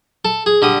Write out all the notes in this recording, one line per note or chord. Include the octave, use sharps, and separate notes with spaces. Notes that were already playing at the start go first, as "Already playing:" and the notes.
A4
G#4
D3 G3 D#6